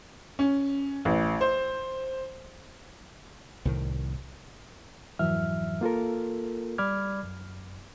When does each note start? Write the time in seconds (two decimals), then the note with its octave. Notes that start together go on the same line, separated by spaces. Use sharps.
0.39 C#4
1.05 A1
1.41 C5
3.65 C2 A2 D#3
5.19 F2 G#2 E3 F#3 E5 F6
5.81 A#3 F4 A4 A#4
6.78 G3 D5 B5 D6 F6 G#6
7.23 F#2